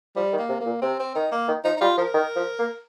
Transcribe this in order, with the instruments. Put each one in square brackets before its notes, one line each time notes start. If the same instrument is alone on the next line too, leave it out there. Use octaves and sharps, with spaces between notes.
[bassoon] F3 [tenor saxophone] G3
[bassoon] D#3
[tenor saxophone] A#3
[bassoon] C3
[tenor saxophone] A#3
[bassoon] A#2
[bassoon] C3 [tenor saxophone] C4
[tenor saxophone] C4
[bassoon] D#3 [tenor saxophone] D#4
[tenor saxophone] A#3
[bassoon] D#3
[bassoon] F3 [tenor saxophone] D#4
[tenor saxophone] D#4
[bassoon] G3 [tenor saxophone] F4
[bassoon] F3 [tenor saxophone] A#4
[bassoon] D#3
F3
A#3